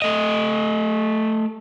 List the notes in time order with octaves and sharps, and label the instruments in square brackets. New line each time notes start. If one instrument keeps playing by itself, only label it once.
[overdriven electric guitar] A3 D#5